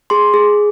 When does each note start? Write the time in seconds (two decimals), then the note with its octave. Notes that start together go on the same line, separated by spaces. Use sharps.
0.10 G#4 C6
0.34 G#4